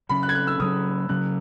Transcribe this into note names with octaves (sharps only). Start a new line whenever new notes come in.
C#3 F#3 C#4 B5
F#6
G#6
F#6
E6
C#3 F#3 C#4 D#6
C#3 F#3 C#4 F#6